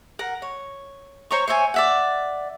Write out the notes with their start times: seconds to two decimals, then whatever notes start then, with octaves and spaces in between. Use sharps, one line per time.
0.19 A#4 F#5
0.42 C#5
1.31 C5 C#5 A#5 C#6
1.48 C5 C#5 E5 G#5
1.74 D5 E5 F#5